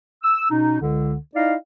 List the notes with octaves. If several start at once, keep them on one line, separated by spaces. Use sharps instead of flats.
E6
B2 C#4 D#4
C#2 D3
D#4 E4 D5 F5